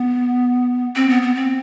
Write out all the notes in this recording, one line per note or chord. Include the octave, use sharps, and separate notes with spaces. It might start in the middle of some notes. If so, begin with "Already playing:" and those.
Already playing: B3
C4
B3
B3
C4